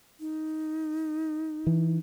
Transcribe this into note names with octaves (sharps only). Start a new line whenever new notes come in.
D#4
E3